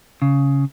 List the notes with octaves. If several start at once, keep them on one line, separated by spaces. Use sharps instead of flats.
C#3